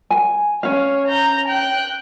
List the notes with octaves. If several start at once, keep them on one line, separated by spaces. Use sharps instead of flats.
G#5
C#4 C#5 F5
A#5 G6
G5 F#6